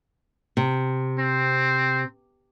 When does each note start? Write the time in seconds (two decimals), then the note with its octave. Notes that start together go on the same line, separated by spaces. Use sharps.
0.57 C3
1.19 C4